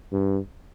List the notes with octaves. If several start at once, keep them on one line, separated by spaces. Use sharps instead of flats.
G2